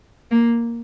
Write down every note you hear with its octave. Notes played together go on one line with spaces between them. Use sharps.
A#3